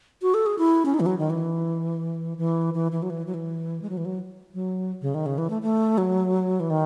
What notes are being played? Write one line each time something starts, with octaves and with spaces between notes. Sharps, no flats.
F#4
A4
G#4
E4
C#4
D#4
E3
F#3
D#3
E3
E3
E3
E3
F#3
E3
F#3
E3
G#3
F#3
E3
F#3
F#3
C#3
D#3
C#3
E3
A3
A3
F#3
E3
D#3